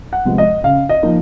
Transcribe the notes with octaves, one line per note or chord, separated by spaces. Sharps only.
F#5
C3 F3 G#3 B3
D#5
C#3 F5
D#5
F3 A#3 D#4